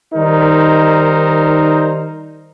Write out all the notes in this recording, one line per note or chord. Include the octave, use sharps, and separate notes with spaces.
D#3 G3 D#4 A#4 C5